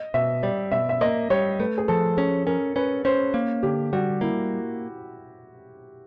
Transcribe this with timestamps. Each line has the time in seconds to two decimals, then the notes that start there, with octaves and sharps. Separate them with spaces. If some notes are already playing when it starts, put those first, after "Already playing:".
Already playing: D#5
0.14 B2 E5
0.43 G3 D5
0.71 B2 E5
0.89 E5
1.01 A#3 D#5
1.30 G3 C#5
1.60 A3 B4
1.78 G#4
1.88 F3 A4
2.17 C#4 G#4
2.47 C#4 A#4
2.76 C#4 B4
3.05 C#4 C5
3.34 A#3
3.63 D3 G4
3.93 G3 F#4
4.21 A#3 E4